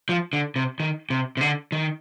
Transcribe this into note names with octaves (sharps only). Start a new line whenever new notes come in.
F3
D3
C3
D#3
C3
C3
D3
D#3